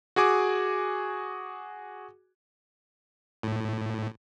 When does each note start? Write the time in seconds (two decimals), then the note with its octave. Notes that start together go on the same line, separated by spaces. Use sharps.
0.16 F#4 G#4 G#5 D6
3.43 A2